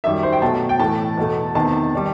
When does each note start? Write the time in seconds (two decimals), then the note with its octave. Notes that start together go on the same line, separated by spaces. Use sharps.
0.04 F#2 D#3 G3 E5
0.23 C5
0.33 G5
0.42 B2 F#3 A3 A5
0.69 G5
0.79 A2 E3 A3 A5
1.17 E2 B2 A3
1.55 E2 C3 D#3 A5
1.95 D#3 G3